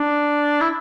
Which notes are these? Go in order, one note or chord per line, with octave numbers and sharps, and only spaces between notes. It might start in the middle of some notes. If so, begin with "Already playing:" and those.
Already playing: D4
E4